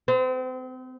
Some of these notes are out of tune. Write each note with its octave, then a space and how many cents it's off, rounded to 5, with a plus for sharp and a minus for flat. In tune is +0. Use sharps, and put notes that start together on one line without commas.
C4 -35